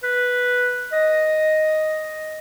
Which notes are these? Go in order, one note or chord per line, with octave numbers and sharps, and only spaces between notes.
B4
D#5